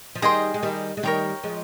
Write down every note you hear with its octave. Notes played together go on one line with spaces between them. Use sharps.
F3
D#3 G3 G#4 D#5 G5 C6
G#3
D#3 G3
G#3
D#3 G3 A#4 C#5 G5
F3 G#3